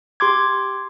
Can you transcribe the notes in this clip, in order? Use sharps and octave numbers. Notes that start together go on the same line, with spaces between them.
G4 C6 D6 G#6